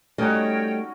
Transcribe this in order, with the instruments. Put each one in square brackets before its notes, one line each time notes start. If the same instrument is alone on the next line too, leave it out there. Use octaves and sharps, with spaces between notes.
[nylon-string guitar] G3 A3 D#5 [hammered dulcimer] C#4 D#4 F#4 [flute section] C#5 G5